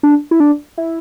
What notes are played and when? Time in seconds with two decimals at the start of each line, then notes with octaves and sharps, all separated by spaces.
0.03 D4
0.31 E4
0.40 D4
0.78 E4